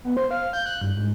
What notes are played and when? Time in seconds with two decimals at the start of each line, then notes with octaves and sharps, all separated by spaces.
0.04 B3
0.17 C5
0.31 F5
0.53 G6
0.66 F#6
0.81 G2
0.96 G#2